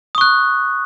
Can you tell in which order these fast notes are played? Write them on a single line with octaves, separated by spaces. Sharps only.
D#6 C#6 F#6